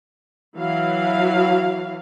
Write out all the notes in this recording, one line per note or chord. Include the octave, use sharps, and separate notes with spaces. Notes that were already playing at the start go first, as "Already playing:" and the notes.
E3 F#3 F5